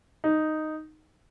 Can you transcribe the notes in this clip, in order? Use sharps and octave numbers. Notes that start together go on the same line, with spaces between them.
D#4